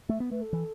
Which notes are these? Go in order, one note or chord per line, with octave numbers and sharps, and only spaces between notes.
A3 E5
B3
A3 B4
A4
E3